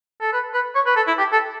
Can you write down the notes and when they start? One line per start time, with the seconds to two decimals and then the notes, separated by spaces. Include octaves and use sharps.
0.21 A4
0.33 B4
0.54 B4
0.75 C#5
0.86 B4
0.96 A4
1.07 E4
1.18 G4
1.32 A4